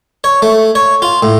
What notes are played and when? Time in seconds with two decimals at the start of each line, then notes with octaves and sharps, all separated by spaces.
0.24 C#5
0.42 A3
0.75 C#5
1.02 F4
1.23 A2